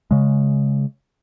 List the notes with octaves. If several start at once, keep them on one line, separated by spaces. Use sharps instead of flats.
C#3 G#3